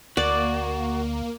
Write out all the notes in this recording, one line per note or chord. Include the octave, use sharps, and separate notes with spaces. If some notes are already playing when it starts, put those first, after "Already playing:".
D2 A#3 F#4 D5